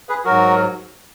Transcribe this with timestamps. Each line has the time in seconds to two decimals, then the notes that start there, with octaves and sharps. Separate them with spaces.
0.09 G#4 B4
0.25 G#2 F#3 F#4 A#4